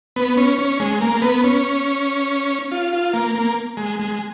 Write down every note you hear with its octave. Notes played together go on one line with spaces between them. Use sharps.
B3
C#4
C#4
G#3
A#3
B3
C#4
F4
F4
A#3
A#3
G#3
G#3